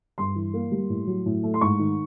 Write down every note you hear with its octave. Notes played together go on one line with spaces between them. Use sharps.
G2 C6
E3
A#3
G3
A2
F#3
A2
A3
C6
G#2 C#6
D#3